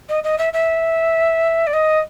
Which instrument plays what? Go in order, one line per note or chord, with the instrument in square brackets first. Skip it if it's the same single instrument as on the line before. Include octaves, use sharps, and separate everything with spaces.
[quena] D#5
D#5
E5
E5
D5
D#5